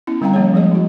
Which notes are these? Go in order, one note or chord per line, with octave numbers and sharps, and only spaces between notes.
B3 C#4 E4
D3 G3 C4 F5 G5 A#5
F3 G3 A#3 C#4 G#4 C#5
F3 G#3 G#4 D#5
E4 F#4